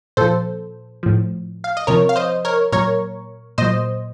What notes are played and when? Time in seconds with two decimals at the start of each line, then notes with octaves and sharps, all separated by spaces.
0.17 A#2 F3 A4 C5
1.03 A2 F3
1.64 F5
1.77 D#5
1.87 C3 F3 A#4 C#5
2.09 F5
2.16 C5 D#5
2.45 A#4 C#5
2.72 A#2 F#3 A#4 C#5
3.58 A#2 F#3 C5 D#5